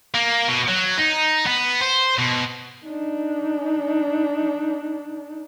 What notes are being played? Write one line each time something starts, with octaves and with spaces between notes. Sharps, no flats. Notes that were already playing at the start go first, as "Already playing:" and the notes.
A#3
B2
F#3
D#4
B3
C5
B2
D4 D#4